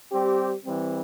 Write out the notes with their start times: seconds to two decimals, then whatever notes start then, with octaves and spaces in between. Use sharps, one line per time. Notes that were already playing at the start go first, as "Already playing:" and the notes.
0.12 G3 C4 G4
0.62 E3 G3 C4